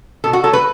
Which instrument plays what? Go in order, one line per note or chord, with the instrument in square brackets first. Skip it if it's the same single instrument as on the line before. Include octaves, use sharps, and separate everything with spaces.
[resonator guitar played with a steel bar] B2 A4
F#4
F#3 A4
A3
B4